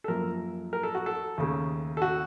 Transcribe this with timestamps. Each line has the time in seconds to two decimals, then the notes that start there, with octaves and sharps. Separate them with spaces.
0.04 A4
0.08 F#2 F3 A#3 A#4
0.73 A#4
0.83 A4
0.95 F#4
1.06 A4
1.38 D#2 C#3 A3
1.97 A4
2.02 F#4